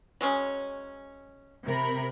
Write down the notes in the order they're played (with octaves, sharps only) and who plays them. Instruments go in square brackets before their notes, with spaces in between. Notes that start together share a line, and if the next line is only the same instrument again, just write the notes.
[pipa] F#3 G#3 C#4
[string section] C3 A#4 B5